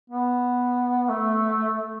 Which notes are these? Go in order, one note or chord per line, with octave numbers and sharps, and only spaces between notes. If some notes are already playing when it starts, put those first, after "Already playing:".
B3
A3